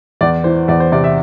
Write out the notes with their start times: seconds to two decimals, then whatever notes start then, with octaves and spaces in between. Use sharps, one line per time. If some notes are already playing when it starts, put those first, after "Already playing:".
0.21 E2 D5
0.44 E3 C5
0.68 E2 D5
0.80 C5
0.92 C3 D5
1.04 E5